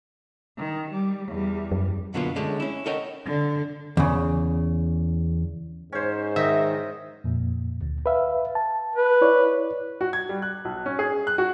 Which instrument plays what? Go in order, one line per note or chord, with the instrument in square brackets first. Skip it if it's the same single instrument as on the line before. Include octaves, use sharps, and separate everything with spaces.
[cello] D#3
G3
E2 G3
[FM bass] F#2
[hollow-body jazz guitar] B2 D3 F#3 A#3 B3 F4
D3 G#3 A3 C#4
C#4 E4
A4 A#4 C#5 D#5 F#5 G5
[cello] D3
[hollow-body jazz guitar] E2 C#3
[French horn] G#2 [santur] C#4 C5
[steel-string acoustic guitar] D#3 [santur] D#5 [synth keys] E5 A#6
[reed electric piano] F2 A#2
D2
B4 E5 F5
A5
[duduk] B4
[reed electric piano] E4 C#5 D5
[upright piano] F#4
G#6
G3
F#6
B1
C#4
G#4
F#6
F#4